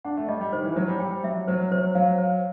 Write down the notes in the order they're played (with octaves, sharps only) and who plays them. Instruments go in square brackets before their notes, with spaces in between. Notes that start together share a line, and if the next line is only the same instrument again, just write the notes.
[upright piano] D4 [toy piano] F#5
[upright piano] A3
[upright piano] G3 [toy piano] D#5
[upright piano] G3
[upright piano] D#3 [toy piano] C5
[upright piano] E3
[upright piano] F#3 [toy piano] C5
[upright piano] G3
[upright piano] G3 [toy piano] G5
[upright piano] F#3 [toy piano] E5
[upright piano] F#3 [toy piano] C5
[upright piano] F#3 [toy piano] C5
[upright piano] F#3 [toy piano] F5
[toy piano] C5